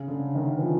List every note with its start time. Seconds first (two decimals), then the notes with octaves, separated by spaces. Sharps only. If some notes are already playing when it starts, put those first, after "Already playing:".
Already playing: C#3
0.08 D3
0.35 D#3
0.58 E3
0.62 F3